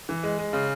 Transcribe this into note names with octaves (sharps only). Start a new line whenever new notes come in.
E3
G#3
G#3
C#3